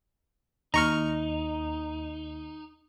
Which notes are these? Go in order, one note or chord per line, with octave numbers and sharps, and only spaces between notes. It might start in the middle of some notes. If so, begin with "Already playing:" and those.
D#2 D#4 A#5 C#6 F6